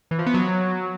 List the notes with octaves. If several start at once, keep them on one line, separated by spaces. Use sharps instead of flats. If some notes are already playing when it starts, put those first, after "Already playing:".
E3
F3
B3
F#3